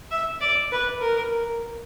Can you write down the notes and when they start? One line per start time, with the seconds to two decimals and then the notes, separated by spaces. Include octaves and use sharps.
0.11 E5
0.41 D5
0.71 B4
1.00 A#4